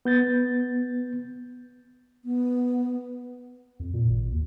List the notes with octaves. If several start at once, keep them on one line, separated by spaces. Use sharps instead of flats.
B3 G6 A6
B3
F2
A#2
G#1
D#2